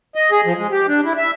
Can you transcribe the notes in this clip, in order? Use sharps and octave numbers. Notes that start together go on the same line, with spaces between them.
D#5
G#4
F3
G#3
G4
D4
E4
E5